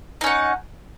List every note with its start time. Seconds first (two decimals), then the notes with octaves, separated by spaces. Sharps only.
0.21 D#4
0.24 C#4
0.26 F#5